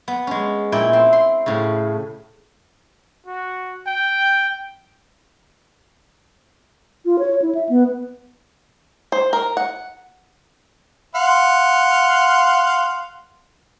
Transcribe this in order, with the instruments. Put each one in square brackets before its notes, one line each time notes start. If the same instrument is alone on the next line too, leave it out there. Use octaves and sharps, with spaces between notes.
[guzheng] B3
G#3 C#4
A#2 E4 G5
C4
C6
A2 C#3
[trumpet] F#4
G5
[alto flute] F4
C#5
E4
E5
B3
[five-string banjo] C5
A#4
F#5
[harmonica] F5 F#5 C6